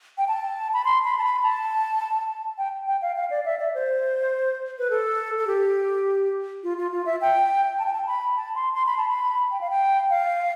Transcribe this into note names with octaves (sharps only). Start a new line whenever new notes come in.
G5
A5
B5
C6
B5
A5
B5
A5
G5
G5
F5
F5
D5
E5
D5
C5
B4
A4
A4
G4
F4
F4
F4
E5
G5
A5
G5
A5
B5
A5
C6
C6
B5
A5
B5
G5
F5
G5
F5